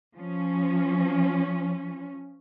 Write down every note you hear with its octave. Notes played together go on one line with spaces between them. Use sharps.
F3 C#4